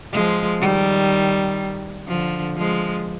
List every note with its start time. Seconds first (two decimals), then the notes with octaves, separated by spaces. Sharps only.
0.13 F3 G#3
0.61 D#3 G3
2.08 D3 F3
2.56 F3 G#3